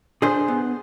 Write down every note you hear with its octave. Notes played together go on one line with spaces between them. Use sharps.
D4 G#4 C5
B3